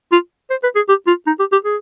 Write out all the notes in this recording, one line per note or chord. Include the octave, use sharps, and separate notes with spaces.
F4
C5
B4
G#4
G4
F4
D#4
G4
G4
G#4